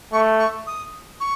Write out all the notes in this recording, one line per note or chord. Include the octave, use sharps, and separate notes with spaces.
A3 C#6
C#6
D#6
C#6